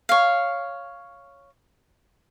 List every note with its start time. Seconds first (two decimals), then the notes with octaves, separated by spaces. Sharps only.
0.09 C#5 F5